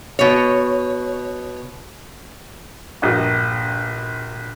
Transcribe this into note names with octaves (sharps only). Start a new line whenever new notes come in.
B2 C#5
A#1 G2 F#4